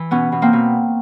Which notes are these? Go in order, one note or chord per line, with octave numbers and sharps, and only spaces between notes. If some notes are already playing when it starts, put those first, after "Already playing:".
Already playing: E3
B2 B3 C#4
B2
A#3 C4
B2